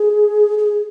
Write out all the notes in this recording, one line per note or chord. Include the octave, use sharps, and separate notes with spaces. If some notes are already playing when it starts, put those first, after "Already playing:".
Already playing: G#4
G#4